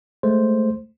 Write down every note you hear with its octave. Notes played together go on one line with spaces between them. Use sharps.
G#3 A3 C5